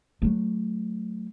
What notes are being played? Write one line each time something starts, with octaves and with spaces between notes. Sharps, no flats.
F#3 A3